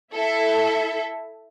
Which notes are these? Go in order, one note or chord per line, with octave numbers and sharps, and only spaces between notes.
E4 A4 E5